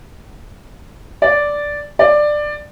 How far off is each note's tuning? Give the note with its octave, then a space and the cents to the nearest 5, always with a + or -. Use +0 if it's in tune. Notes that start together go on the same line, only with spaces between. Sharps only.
D5 -5
D5 +15